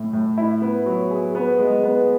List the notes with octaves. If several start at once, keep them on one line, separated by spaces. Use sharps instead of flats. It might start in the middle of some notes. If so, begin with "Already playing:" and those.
Already playing: A2
A2
E4
B3
F#3
G#4
B3
G#3
B3